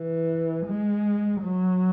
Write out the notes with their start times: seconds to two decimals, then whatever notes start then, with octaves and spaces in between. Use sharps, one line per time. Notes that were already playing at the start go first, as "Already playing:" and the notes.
Already playing: E3
0.66 G#3
1.42 F#3